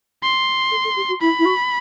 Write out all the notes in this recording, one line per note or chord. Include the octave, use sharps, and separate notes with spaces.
C6
A4
A4
G4
F#4
E4 B5
E4
F#4